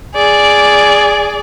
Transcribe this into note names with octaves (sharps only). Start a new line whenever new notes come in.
G#4 D5